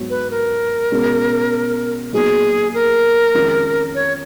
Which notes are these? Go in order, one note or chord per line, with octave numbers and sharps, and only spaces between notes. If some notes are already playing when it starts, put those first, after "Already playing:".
Already playing: G#2 F#3 B3 F#4 C#5
B4
A#4
B2 G#3 C#4
A#2 F#3 B3 D#4 G#4
A#4
F2 D#3 G#3 C#4 F4
C#5